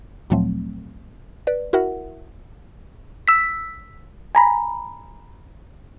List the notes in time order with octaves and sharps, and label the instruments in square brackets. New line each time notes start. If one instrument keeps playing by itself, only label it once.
[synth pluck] D2 A#2 F3 F#3 A3 C4
B4 D5
E4 F#4 A#4 E5 F#5
[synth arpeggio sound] E6 B6
G#5 A#5 B5